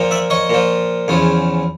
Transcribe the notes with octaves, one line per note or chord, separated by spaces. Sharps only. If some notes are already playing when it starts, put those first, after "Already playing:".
Already playing: A#2 F3
D5 E5
C#5 D#5
A#2 F3
E2 C#3 F3